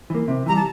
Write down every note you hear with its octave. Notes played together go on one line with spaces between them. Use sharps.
E3 A#3
C3
E3 G3 A#5
A5